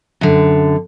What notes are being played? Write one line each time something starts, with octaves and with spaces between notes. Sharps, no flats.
F#2 D3